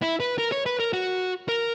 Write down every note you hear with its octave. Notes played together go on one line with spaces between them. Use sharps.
E4
B4
A#4
C#5
B4
A#4
F#4
A#4